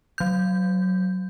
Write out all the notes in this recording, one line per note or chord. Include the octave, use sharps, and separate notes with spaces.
F#3 G6